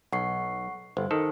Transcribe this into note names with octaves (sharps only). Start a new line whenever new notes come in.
B1 F#5 C#6 C7
G1 C5
D#3 A4